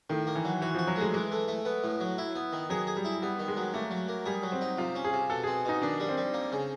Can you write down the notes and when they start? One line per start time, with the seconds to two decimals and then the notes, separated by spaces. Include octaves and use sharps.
0.10 A2 D#3
0.27 A#3
0.35 E3
0.45 F#3
0.62 E3 F#4
0.75 F3 F#4
0.87 F#3
0.96 G#3 A3
1.13 E3 G#3
1.32 A3
1.48 A3
1.65 B3
1.84 A2
2.00 F#3
2.18 E4
2.35 B3
2.53 D#3
2.70 F#3 G#4
2.87 G#4
2.96 G3
3.05 E4
3.22 G3 B3
3.39 D#3
3.48 G#3
3.57 F#3
3.74 A3 A#3
3.91 F#3
4.08 A#3
4.26 G3 G#4
4.43 F#3
4.52 C4
4.61 D#4
4.78 C3 F4
4.95 C#4
5.04 G#4
5.13 C3
5.30 B2 A4
5.44 C4 G#4
5.65 B2 D#4
5.82 D#3 D4
6.00 G3
6.09 C4
6.17 G3
6.34 A#3
6.52 C#3